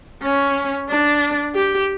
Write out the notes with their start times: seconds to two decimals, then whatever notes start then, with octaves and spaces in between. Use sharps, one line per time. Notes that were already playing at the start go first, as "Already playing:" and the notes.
0.23 C#4
0.89 D4
1.55 G4